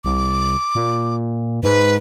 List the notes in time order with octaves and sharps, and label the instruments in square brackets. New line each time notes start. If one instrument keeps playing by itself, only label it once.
[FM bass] C2 [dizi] D6
[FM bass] A#2
[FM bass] G#2 [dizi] B4